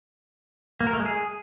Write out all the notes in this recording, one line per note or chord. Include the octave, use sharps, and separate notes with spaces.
A#3
A#4
A3
G#3
G#4